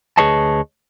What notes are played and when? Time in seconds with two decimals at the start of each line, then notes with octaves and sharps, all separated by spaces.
0.18 D2 G#4 B4 C#5 D#5 A5